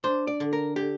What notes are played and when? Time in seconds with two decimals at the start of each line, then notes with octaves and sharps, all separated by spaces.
0.04 D4 C5
0.27 D5
0.40 D3
0.53 A#4
0.76 D3 G4